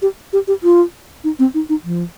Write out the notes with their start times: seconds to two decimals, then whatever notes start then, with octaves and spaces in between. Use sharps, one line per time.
0.02 G4
0.33 G4
0.48 G4
0.63 F4
1.24 D#4
1.39 C4
1.54 D#4
1.69 D#4
1.84 F3